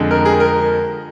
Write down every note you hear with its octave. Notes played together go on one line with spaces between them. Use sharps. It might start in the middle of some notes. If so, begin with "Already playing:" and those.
Already playing: F2 D3 G#3
A#4
G#4
A#4